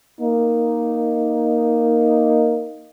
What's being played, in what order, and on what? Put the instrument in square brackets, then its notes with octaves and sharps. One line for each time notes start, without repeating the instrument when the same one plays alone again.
[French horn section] A#3 D#4